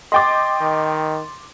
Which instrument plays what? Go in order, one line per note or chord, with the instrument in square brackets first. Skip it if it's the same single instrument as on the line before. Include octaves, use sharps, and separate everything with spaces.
[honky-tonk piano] D#5 G5 D6 [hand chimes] C6 A6
[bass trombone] D#3